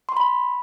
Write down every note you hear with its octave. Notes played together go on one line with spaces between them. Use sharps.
C6
B5